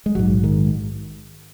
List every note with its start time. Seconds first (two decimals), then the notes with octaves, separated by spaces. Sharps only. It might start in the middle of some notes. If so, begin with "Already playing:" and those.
0.06 G#3
0.15 A#1 G#2 F#3
0.43 D#3 G#3